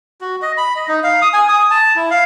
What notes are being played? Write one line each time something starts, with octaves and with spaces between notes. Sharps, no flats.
F#4
D#5
B5
D#5
D#4
F5
D#6
G#5
D#6
A5
E4
F5